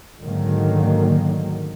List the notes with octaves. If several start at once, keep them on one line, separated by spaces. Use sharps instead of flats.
G#2 D3 D#3 F#3 A#3